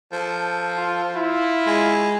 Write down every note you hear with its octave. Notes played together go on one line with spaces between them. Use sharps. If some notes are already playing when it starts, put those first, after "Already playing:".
F3 A4
F4
E4 F4
G#3